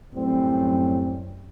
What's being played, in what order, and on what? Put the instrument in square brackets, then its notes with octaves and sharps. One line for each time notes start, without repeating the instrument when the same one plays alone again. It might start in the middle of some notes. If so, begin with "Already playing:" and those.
[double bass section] F#2 [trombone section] A2 G3 C4